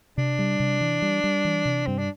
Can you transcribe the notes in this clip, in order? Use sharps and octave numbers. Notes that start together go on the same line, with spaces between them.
C3 D4
G3
C3
E3
G3
G3
E3
C3
G2 C4
D4